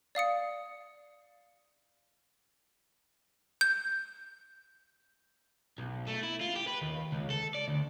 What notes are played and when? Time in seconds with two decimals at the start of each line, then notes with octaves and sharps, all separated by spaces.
0.15 D5 F5 D#6 C#7
3.61 G6
5.78 B1
6.07 A3
6.23 E4
6.41 F4
6.56 G4
6.67 B4
6.82 D#2
7.12 C#2
7.30 A4
7.54 D5
7.68 D2